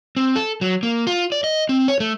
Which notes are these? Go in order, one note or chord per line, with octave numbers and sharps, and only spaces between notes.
C4
A4
F#3
A#3
F4
D5
D#5
C4
C#5
A3